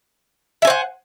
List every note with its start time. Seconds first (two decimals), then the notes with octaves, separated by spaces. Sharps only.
0.62 E5
0.65 G#5
0.67 C5
0.70 F#5